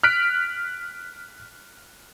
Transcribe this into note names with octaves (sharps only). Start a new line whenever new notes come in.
F6 F#6 B6 D7